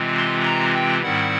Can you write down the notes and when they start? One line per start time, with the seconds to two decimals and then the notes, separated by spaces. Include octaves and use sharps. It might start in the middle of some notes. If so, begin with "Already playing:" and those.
Already playing: C3 E3 G#3 C4 F4
0.17 C6
0.46 A#5
0.74 G5
1.02 G#2 D#3 G3 C4 E4 F#5